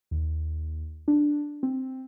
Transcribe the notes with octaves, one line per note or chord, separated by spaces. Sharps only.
D#2
D4
C4